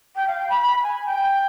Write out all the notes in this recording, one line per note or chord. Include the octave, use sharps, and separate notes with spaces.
G5
F5
G5
B5
B5
G#5
G5